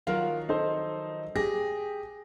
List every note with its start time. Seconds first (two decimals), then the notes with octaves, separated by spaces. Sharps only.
0.07 D#3 F3 F#3 F4 A#4 F5
0.49 D#4 A4 C5
1.36 G4 G#4 G5 A#6